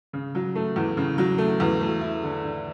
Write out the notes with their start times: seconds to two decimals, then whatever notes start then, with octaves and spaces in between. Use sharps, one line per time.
0.13 C#3
0.35 F#3
0.55 A3
0.76 E2
0.97 C#3
1.18 F#3
1.38 A3
1.60 E2
1.81 A3
2.01 E4
2.23 D3
2.43 D3